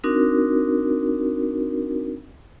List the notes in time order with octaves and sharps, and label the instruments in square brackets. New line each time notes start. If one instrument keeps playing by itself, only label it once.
[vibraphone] C4 D4 D#4 F#4 A#4